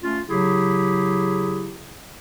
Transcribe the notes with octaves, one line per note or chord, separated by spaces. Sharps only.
A3 C#4 F4
C#3 F#3 E4 G4 G#4